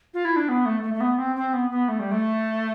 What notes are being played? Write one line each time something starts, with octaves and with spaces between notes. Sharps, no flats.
F4
E4
D4
B3
A3
A3
A3
B3
C4
C4
B3
B3
A3
G3
A3